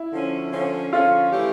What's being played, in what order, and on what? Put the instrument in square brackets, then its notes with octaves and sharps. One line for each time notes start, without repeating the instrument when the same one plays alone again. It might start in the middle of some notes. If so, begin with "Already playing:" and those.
Already playing: [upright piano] E4
[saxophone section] D3 F3 C#4
D3 F3 C#4
[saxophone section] D3 F3 C#4 [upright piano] F4
[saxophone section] E3 A3 E4 G4